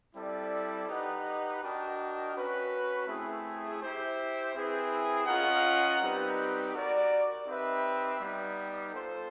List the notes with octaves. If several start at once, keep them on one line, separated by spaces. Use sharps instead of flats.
G3 C4 E4 A4 D5
D#4 G4 B4 D#5 F#5
D4 F#4 A#4 D#5 G5
C#4 F#4 B4
A3 C4 E4 G#4
E4 G4 C5
C4 E4 G#4 B4
C#4 F4 A#4 D#5 F#5
G3 C4 D#4 G4 B4
F#4 A#4 D5
C4 D#4 G4 B4 E5
G3 B3 D#4
F4 A4 C5